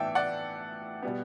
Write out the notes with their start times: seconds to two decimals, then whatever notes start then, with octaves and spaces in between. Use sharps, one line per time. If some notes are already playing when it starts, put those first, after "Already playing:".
Already playing: A2 E3 B3 A4 D5 E5 G5
0.15 D5 F#5
1.03 B2 G3 B3